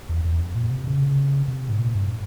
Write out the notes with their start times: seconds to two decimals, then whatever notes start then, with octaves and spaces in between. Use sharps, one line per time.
0.09 E2
0.25 E2
0.39 F2
0.55 A#2
0.71 C3
0.87 C#3
1.48 C3
1.69 G#2
1.79 A#2
1.95 G2